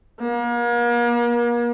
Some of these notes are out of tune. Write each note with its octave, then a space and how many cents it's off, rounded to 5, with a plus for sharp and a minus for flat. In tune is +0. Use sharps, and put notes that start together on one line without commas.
A#3 +40